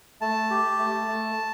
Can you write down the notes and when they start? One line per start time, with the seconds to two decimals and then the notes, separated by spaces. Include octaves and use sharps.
0.21 A3 A5
0.50 G4
0.79 A3
1.08 A3